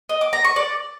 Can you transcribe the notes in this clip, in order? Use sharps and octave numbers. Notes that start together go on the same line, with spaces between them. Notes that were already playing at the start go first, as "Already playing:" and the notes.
D#5
D6
A#5
C#6
D5